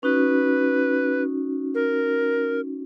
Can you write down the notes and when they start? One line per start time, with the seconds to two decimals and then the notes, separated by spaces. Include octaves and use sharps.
0.03 C#4 D#4 F#4 B4
1.75 A#4